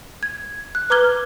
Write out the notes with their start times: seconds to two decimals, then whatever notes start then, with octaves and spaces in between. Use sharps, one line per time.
0.23 G#6
0.75 F#6
0.90 B4 A#5 D6 F6 G#6 G7